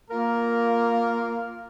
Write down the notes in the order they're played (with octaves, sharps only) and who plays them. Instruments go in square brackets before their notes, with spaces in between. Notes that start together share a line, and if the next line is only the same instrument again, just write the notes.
[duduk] A#3 [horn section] F4 A#4